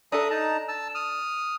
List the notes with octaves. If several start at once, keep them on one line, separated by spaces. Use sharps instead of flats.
D4 A4 E5 A#5 D#6
D#4 A5 A#5
A5 E6
D#6 F6